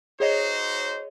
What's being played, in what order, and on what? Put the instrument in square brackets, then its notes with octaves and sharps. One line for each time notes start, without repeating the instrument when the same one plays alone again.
[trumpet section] D#4 F#4 C5 [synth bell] G#4 C#5 D#5